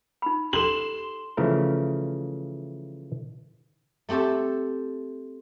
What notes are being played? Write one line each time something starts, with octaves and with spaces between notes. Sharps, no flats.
D#4 B5
G4 A4 C6 E7 F#7
C#3 E3 F3 A3 A#4
A3 C4 G4 A4 E5